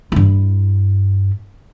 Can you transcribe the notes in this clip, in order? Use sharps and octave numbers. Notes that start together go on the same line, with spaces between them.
G2 E4